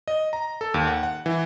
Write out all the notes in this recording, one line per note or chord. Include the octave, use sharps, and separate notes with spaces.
D#5
A#5
A4
D#2
F#5
F#5
E3